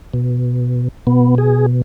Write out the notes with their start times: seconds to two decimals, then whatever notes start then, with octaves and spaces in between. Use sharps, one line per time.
0.14 B2
1.07 B2 B3
1.38 G#4